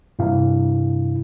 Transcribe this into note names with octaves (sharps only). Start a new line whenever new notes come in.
G2 C3 E4 F5